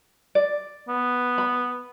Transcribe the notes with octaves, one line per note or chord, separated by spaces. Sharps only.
D5
B3
B5